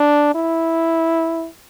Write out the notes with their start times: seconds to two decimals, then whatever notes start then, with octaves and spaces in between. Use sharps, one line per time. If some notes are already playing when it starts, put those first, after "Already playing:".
Already playing: D4
0.35 E4